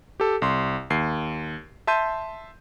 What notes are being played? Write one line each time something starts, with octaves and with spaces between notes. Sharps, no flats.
G4 A4
C2 C6
D#2 C7
E5 A5 C6 G6 D#7